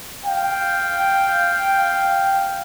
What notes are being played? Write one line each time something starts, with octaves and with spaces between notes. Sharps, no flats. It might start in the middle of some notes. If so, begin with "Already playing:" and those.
F5 G5